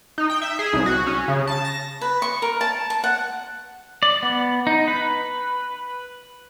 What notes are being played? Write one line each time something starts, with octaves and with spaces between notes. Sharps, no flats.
D#4
G5
E5
G#4
C2
F#4
C#4
C#3
A5
A#6
B4
C#6
A#4
A5
A5
F#5
D5
B3
D#4
B4